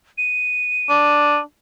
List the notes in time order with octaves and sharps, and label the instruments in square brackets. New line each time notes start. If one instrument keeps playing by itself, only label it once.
[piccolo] D#7
[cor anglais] D4